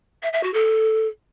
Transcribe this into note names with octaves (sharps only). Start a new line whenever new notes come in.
E5
E5
F#4
A4